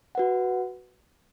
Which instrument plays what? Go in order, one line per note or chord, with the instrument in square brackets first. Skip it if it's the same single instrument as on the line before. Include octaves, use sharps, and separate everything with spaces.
[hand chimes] F#4 B4 F#5